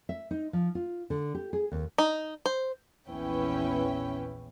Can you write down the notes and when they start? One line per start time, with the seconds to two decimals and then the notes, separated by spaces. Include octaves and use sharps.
0.09 E5
0.31 D#4
0.53 F3
0.75 F4
1.10 D3
1.35 G4
1.53 G#4
1.72 D#2
1.98 D#4
2.46 C5
3.08 A#1 E2 C#4 E4 B4 G5